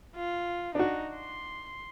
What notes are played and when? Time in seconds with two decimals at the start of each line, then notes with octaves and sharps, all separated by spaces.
0.16 F4
0.75 D4 D#4 F#4
1.15 C6